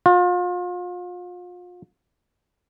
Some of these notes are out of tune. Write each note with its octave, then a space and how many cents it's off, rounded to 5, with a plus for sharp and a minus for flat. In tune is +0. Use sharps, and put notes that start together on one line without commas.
F4 +35